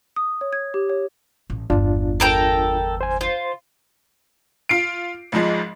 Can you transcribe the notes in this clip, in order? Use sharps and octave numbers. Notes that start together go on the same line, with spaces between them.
D#6
C#5
G#6
G4
C#5
A1
G1 E2 D4 F4
A4 A#4 G5
C5 G#5
F4 C5
F4 C7 D7
G#1 G#2 F3 G#3